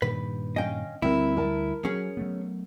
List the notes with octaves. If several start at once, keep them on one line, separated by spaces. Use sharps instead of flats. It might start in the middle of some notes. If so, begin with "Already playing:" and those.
G2 A#2 D#3 B4
C#4 D#5 F5 G5
D2 G3 C4 E4 A#4
A#4 A5
F#3 C#4 G#4
F#3 A3 B3